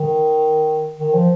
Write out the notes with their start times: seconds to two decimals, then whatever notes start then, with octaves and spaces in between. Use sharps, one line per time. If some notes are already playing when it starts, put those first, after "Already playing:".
Already playing: D#3
1.00 D#3
1.14 F3